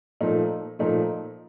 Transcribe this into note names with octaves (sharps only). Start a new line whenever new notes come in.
A#2 F3 A3 D#4
A#2 F3 A3 D#4